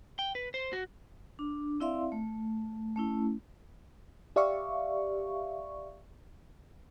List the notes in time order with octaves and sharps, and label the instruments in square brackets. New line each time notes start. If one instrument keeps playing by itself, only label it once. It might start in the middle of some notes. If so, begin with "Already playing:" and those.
[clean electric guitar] G5
B4
C5
F#4
[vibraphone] D4
C4 E4 D5 E5 F5 C6
A3
A3 C#4 E4
[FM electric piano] G4 D5 E5 F5 C#6